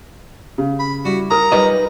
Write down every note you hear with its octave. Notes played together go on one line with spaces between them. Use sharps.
C#3
B5
G3 E4 F#4
A#4 A#5 D#6
G3 D#4 F4 B4 C#5 D#5